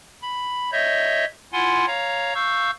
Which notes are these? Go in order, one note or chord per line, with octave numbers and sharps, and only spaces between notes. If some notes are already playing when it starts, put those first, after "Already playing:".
B5
C#5 D#5 E5 G6
E4 F4 F#5 G#5 C6
C#5 F5 A#5
F5 C#6 E6 G6